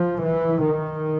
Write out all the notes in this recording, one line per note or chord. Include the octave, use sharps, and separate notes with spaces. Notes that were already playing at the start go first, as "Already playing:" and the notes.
Already playing: F3
E3
D#3